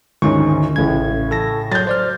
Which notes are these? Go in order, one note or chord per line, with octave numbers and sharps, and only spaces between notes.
D2 G#2 D#3 C#4 C#6
A1 A2 C#3 G#6
A4 A5 A#6
F#3 G6 A6
C5 D5 F6